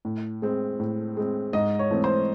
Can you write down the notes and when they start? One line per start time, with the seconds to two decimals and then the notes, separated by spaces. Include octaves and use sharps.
0.05 A2
0.42 G#3 C4
0.80 A2
1.17 G#3 C4
1.53 G#2 D#5
1.79 C#5
1.91 E3 A3 C4
2.04 C5